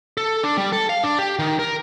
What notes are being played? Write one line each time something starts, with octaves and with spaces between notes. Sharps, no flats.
A4
D4
G3
A4
F5
D4
G4
D#3
A#4